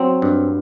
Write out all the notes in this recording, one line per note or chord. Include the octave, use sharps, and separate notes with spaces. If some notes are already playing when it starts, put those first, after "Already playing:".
Already playing: F#3 C4
G2